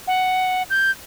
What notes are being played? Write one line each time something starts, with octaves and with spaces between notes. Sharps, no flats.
F#5
G6